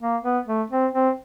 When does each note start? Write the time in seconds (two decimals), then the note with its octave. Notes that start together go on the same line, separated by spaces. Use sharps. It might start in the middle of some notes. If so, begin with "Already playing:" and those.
0.01 A#3
0.23 B3
0.46 A3
0.70 C4
0.93 C4